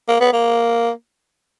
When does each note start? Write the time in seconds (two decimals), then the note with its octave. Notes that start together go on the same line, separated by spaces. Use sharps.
0.08 A#3
0.20 B3
0.33 A#3